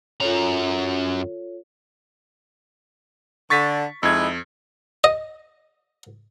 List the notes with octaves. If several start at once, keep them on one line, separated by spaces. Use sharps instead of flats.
F#2 F4 A4 C#5 A#5
D3 C#6 A6 B6
F2 G#3 D#4 E4 G#6
D#5